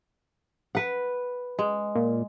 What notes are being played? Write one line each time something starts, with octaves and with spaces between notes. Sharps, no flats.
B4 F#5
G#3
A#2